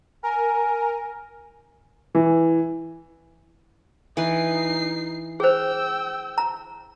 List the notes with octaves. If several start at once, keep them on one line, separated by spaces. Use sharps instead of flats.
A#4 G#5
E3
E3 D#4 B4 C7
G#4 C5 G5 E6
A#5